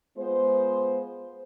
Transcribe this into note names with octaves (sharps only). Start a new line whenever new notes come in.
G#3 B3 F4 C5